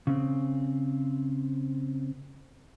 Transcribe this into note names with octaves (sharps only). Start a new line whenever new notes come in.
C#3 C4